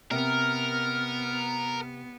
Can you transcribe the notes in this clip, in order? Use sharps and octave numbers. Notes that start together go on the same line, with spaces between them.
C3 B3 A#4 F6